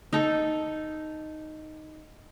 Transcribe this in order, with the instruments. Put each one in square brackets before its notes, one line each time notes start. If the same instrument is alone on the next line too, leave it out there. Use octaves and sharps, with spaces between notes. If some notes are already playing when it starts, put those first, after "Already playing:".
[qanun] D#4 A4